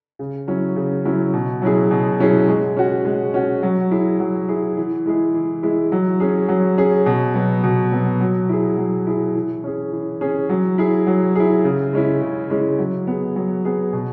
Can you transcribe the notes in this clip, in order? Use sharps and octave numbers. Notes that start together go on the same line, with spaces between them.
C#3
F#3 C#4 E4
C#3
F#3 C#4 E4
B2
F#3 C#4 E4 G#4
B2
F#3 C#4 E4 G#4
G#3
C#4 F#4
G#3
C#4 F#4
F#3
E4 G#4
F#3
E4 G#4
E3
G#3 E4 G#4
E3
G#3 E4 G#4
F#3
C#4 G#4
F#3
C#4 G#4
B2
F#3 B3
B2
F#3 B3
F#3
E4 G#4
F#3
E4 G#4
E3
C#4 G#4
E3
C#4 G#4
F#3
E4 G#4
F#3
E4 G#4
C#3
G#3 C#4 E4
C#3
G#3 C#4 E4
F#3
B3 G#4
F#3
B3 G#4
B2